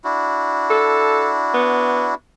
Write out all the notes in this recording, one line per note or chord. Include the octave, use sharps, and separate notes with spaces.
D4 E4 F#4
A4
B3